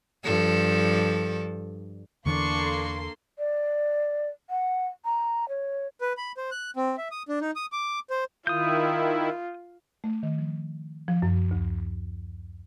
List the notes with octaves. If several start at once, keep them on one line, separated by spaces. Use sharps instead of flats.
G2 F3 A4
E2 D3 E3 A#3 D4 A4 C6 C#6
D5
F#5
A#5
C#5
B4
B5
C5
F#6
C4
E5
D#6
D4
D#4
D#6
D6
C5
D#3 E4 F4 D#6 G6
A3
D#3
F3
F3
F#2
D2